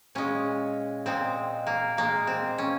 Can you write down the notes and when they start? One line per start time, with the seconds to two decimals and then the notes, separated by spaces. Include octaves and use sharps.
0.15 A#2 G#3 C#4
1.06 A#2 G#3 C4
1.67 A#3
1.97 A#2 G#3 A#3
2.27 C4
2.58 C#4